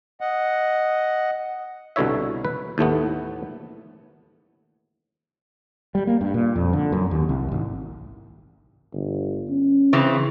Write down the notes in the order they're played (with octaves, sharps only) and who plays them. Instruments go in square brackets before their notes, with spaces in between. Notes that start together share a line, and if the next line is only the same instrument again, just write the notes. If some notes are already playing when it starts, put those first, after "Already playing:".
[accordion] D#5 F#5
[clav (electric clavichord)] C2 B2 D3 E4 C#5 E5
B4
D#2 A2 A3 B3
[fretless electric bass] G3
A#3
G2
A#2
F2
D3
F#2
D#2
C2
G#1
[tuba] G1
C#4
[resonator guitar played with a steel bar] C#3 E3 C4